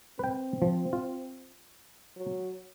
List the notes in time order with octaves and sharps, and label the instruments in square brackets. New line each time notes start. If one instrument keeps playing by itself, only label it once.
[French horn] C4 [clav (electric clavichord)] B4 G5
[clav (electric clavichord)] F3
F4
[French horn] F#3